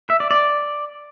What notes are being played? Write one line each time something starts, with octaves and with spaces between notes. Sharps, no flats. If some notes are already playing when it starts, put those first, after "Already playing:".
E5
D5
D5